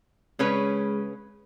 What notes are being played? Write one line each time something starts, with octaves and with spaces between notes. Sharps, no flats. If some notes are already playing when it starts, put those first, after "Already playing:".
C#3 G#3 C#4 B4